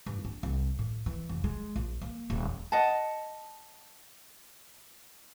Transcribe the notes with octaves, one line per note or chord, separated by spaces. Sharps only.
G2
D4
C2
A2
E3
F1
G#3
A#1
A#3
D#1
D#5 F#5 A5